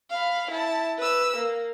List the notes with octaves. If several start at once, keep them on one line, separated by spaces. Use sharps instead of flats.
F5 B5
E4 A5
B4 E6
A#3